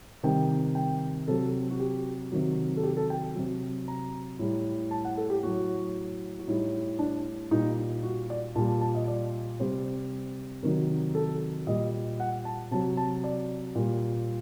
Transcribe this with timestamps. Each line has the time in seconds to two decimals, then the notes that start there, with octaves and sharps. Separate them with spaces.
0.23 C3 D#3 G3 G5
0.75 G5
1.28 C3 F#3 A4
1.70 F#4
1.79 G4
2.32 C3 D#3 F#3
2.77 A4
2.83 G4
2.97 A4
3.10 G5
3.36 C3 F#3
3.88 A#5
4.39 A2 G3
4.91 A5
5.05 F#5
5.18 A4
5.30 G4
5.43 A2 F#3 F#4
6.39 F#4
6.48 A2 G3 D#4
6.99 D4
7.51 A#2 G3 D#4
8.03 F#4
8.30 D5
8.55 A#2 G3 A5
8.68 A5
8.81 A5
8.95 D#5
9.08 D5
9.60 C3 G3 C5
10.63 C3 D#3 F#3 A#4
11.15 A4
11.67 A#2 G3 D#5
12.20 F#5
12.45 A5
12.71 C3 F#3 A5
12.97 A5
13.24 D5
13.75 A#2 G3